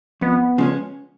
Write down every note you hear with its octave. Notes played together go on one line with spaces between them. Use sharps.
F2 B3
C#3 F3 G#3 C#4